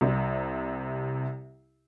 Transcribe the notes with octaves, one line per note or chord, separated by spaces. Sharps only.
C2 C3